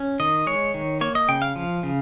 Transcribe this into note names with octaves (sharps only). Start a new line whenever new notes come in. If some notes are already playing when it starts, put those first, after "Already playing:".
Already playing: C#4
D#3 D#5
G#3 C#5
D#3
A#3 C#5
D#5
C#3 G5
F5
F3
C#3